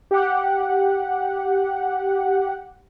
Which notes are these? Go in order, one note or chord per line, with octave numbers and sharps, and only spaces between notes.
G4 F#5